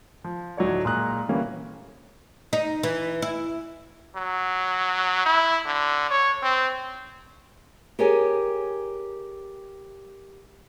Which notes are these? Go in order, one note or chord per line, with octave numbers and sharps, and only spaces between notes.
F3
D2 A2 F#3 D#4 C#5 D5
A#2 G#3 A#5 D#6 F#6
D3 E3 G3 A#3 C#4
D#4
E3
E4
F#3
E4
D3
C#5
C4
G4 G#4 A#4 C#5 G#5